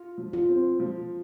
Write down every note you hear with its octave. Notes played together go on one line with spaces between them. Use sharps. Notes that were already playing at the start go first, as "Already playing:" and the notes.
Already playing: F4
F3
F4
C4
F3